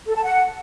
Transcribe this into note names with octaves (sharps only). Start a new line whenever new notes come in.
A4
A5
F#5